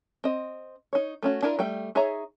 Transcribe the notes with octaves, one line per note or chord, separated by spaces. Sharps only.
C4 D#5
D#4 C#5
A3 C#4 F#4
D4 E4 F4 A#4
G3 A3 G5
D#4 G#4 C#5 E5 A#5